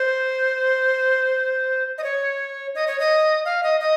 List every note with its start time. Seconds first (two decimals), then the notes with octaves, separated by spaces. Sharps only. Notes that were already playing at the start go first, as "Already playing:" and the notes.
Already playing: C5
1.98 D#5
2.04 C#5
2.75 D#5
2.87 C#5
3.00 D#5
3.45 F5
3.63 D#5
3.80 D#5